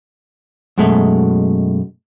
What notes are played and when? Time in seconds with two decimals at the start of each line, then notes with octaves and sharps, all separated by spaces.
0.78 F#2 B2 G#3 A3